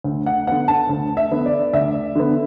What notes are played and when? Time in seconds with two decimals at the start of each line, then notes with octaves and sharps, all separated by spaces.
0.04 D2
0.26 F#5
0.47 D3 B3 F#5
0.68 A5
0.89 D2
1.17 E5
1.31 D3 B3
1.46 D5
1.73 D2 E5
2.16 D3 B3